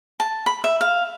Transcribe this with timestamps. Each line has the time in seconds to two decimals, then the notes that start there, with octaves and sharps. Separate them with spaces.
0.20 A5
0.46 B5
0.64 E5
0.81 F5